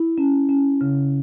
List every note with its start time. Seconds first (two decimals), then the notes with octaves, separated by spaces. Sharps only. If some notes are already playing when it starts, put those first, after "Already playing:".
Already playing: E4
0.18 C#4
0.49 C#4
0.81 C#3